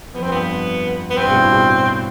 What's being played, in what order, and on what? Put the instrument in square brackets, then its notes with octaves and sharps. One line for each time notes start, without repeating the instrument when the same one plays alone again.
[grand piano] F2 [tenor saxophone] B3
[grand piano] G2 [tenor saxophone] C4
[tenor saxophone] B3
[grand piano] F2
[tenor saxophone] B3
[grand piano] G2 [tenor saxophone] C4
[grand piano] B2
A2
B2